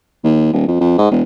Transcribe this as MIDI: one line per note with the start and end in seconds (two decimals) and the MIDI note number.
0.24 0.48 39
0.53 0.67 27
0.68 0.76 41
0.80 0.95 41
0.98 1.10 44
1.11 1.22 28